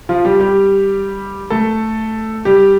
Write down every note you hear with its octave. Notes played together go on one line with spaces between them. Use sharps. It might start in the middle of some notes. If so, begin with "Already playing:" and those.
F3 F4
G3 G4
G3 G4
A3 A4
G3 G4